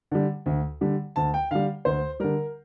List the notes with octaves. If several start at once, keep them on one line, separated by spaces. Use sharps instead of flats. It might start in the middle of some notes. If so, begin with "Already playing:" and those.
D3 G3
D2
D3 G3
D2 A5
G5
D3 G3 F5
D2 C5
D3 G3 A#4